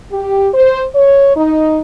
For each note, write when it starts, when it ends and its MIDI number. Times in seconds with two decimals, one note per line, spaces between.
0.11 0.48 67
0.54 0.85 72
0.95 1.35 73
1.37 1.81 63